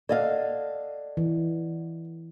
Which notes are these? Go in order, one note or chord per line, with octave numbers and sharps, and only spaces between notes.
A4 D5 D#5 F5 F#5
E3